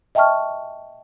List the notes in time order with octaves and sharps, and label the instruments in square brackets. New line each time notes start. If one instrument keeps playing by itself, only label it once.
[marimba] D#5 E5 G5 A5 C#6 F6